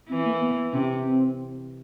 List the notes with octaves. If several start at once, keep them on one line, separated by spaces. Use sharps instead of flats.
E3 C4
A#3
B3
C3 C#4
C4